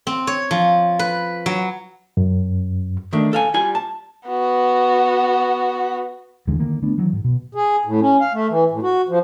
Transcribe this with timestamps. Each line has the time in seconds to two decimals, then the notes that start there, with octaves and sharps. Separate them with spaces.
0.07 C4
0.27 C#5
0.51 F3
0.99 B4
1.46 F#3
2.17 F#2
3.13 D#3 A3 D4
3.33 A4 F5 G#5
3.54 G3 F4 G#5
3.75 A5
4.28 B3 F#4
6.47 D#2 D3 E3 G#3
6.60 D3 D#3 A#3
6.82 D3 A3 B3 D4
6.98 D#3 E3 F#3
7.13 G#2
7.24 B2
7.55 G#4
7.85 A2
8.01 C#4
8.20 F5
8.33 A3
8.50 E3
8.71 A2
8.83 F#4
9.09 F3